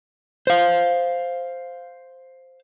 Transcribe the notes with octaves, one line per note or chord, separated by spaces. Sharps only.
C5 F5